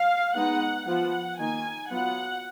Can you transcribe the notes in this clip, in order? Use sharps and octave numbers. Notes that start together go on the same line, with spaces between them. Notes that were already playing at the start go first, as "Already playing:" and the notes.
Already playing: F5
G#3 B3 D#4 F#5
F3 B3 F4 F#5
D#3 A#3 D#4 G#5
F#3 B3 F4 F#5